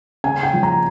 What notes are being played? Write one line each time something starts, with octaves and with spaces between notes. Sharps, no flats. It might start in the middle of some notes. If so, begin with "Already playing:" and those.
C#3 G#5
G5
F3
A#5